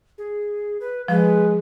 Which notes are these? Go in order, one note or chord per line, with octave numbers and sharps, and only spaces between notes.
G#4
B4
F3 G#3 B4